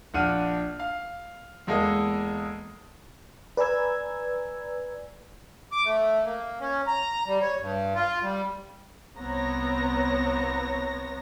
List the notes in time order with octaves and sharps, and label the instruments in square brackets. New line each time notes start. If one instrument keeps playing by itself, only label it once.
[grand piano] A#1 D4 F#5 F6 D#7
F5
E2 G#3 A#3 A4 D#5
[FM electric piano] B4 D5 G#5 A#5 E6 G#6
[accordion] D6
A3
A#3
C#4
A#5
G3
C#5
G2
F4
G3
[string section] C2 B3 C4 C#5 A#5 A#6